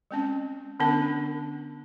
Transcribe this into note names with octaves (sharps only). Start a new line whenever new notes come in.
G#3 C4 C#4
D3 B3 C#4 D4 A#4